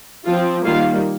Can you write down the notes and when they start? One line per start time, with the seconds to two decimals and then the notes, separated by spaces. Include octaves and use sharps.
0.26 F3 C4 F4
0.65 D#3 G3 A#3 F4 F5